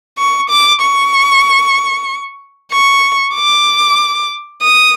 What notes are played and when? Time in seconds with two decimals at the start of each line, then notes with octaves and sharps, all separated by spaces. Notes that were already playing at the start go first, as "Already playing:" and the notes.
0.18 C#6
0.50 D6
0.81 C#6
2.72 C#6
3.35 D6
4.62 D#6